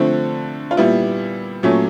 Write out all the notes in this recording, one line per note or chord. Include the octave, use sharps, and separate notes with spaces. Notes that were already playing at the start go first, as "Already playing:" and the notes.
Already playing: D3 F3 A3 C4
F4
A#2 G3 B3 E4
A#2 F#3 A3 C#4